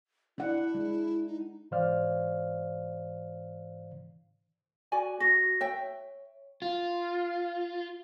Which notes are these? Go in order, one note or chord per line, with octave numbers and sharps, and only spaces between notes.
D4 E4 F#5
G#3
D#4
G#2 E3 C5 D5 F5 F6
F#4 D5 G#5
F#4 A#6
C#5 E5 G5
F4